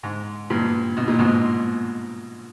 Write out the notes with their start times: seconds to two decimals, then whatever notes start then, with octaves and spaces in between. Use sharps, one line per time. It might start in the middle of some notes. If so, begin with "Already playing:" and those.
0.03 G#2
0.50 G2 A#2
0.97 B2
1.08 A#2
1.19 G#2 B2